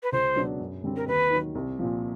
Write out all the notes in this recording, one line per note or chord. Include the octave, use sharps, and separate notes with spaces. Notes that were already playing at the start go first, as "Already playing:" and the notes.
B4
C#2 C5
B2 F#3 B3 D4
F#2
D3 G3 C4
A#4
D#2 B4
D#3 F#3
C2
A#2 F3